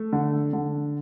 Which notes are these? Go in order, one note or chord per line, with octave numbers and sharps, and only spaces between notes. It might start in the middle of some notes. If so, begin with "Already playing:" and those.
Already playing: A3
D3
D3